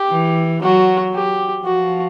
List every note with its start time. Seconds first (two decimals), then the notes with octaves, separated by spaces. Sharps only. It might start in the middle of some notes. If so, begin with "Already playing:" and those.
Already playing: G4
0.11 E3
0.62 F#3 F#4
1.14 G4
1.65 F3 F#4